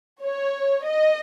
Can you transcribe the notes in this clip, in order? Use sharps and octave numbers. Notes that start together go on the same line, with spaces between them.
C#5
D#5